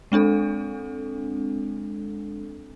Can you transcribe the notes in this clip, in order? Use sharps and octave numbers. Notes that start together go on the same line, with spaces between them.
G#3 C4 D4 A4